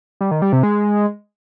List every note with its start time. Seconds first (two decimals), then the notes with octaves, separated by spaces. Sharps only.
0.21 G3
0.31 D#3
0.42 G3
0.53 C3
0.63 G#3